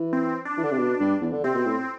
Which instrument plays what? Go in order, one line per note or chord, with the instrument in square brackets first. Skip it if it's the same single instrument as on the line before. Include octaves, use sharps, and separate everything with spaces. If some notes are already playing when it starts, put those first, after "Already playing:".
Already playing: [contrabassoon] E3
[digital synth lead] C4
D4
[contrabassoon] E3
D3
C3
B2
G2
E2
D3
[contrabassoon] C3 [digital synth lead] C4
[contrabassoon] B2
A2